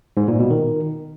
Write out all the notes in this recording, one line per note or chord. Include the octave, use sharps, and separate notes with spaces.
G#2
A#2
B2
D#3